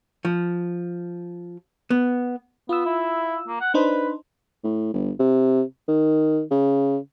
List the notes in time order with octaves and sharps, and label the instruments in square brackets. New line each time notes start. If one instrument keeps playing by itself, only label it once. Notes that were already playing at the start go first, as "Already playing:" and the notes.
[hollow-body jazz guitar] F3
B3
[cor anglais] B3 [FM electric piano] F4 E6
[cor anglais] E4
A#3
F#5
[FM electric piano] D4 D#4 C5 [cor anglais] B4
[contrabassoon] A2
G1
C3
D#3
C#3